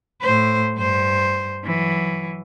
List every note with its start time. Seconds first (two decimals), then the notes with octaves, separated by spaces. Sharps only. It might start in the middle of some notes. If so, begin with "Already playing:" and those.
0.22 A2 C5
0.77 G2 C5
1.64 E3 F#3